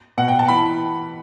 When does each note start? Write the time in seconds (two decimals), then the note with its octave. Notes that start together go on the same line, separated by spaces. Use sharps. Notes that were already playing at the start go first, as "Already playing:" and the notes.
0.18 B2 F#5
0.28 G5
0.39 A5
0.48 E3 B5